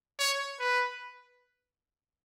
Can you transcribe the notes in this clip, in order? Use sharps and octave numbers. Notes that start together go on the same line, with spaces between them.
C#5
B4